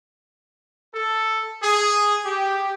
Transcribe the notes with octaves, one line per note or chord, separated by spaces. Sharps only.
A4
G#4
G4